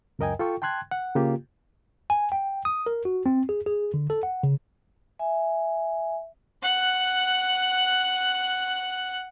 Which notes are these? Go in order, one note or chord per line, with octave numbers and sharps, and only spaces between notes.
C#2 F#2 A#4 D#5 G5 G#5
F4 A4 G5 C#6
G5 A5 C6 F#6 G#6
F#5
C#3 A#3 F4 G4
G#5
G5
D#6
A#4
F#4
C4
G#4
G#4
D3
A4
F#5
C#3
E5 G#5
F#5 F#6